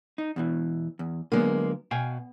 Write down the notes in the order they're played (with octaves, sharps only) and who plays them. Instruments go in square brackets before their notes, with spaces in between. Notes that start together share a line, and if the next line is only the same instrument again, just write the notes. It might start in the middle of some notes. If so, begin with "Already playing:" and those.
[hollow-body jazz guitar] D#4
E2 B2 E3
E2
[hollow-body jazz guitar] D3 F#3 B3 [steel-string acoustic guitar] G#3 A#3
[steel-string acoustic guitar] B2 [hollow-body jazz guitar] F5 G5 G#5